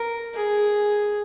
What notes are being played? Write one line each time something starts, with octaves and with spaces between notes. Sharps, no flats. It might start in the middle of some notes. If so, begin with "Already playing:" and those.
Already playing: A#4
G#4